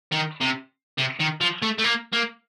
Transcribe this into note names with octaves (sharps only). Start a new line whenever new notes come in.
D#3
C3
C3
D#3
F3
A3
A3
A#3
A#3